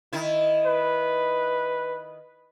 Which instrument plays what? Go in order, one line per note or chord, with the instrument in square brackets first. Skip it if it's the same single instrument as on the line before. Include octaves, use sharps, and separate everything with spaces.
[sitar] D#3 E4
[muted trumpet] B4